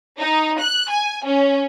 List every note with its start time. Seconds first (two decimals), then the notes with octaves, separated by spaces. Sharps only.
0.19 D#4
0.60 F#6
0.90 G#5
1.24 C#4